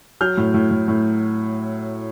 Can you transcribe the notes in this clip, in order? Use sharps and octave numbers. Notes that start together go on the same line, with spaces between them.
F#3 F6 G6
A2
A2
A2
A2